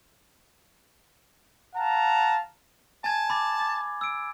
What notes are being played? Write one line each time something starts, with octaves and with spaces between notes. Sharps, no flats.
F5 F#5 A5 A#5
G#5 A5 G#6
B5 D6 A6
D6
E6 D7